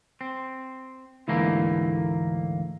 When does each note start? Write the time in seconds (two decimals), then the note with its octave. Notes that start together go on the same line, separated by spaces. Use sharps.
0.21 C4
1.28 D2 G#2 E3 A3 A#3